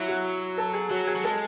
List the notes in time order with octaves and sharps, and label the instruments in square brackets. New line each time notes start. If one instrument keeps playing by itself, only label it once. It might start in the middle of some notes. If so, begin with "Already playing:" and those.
Already playing: [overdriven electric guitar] F#3 [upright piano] E4
[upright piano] F#4
A4
G#4
[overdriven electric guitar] F#3 [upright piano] F#4
[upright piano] G#4
[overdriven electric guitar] F#3
[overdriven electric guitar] G#3 [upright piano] A4